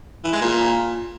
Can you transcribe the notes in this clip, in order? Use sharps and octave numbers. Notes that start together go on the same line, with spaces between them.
E3
G#3
A#2